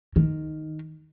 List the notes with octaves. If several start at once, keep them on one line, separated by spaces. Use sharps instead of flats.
D#3